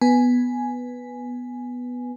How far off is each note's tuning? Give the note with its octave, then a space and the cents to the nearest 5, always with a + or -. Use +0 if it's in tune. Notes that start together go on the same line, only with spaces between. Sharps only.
B3 +0 B4 +0 G#5 +5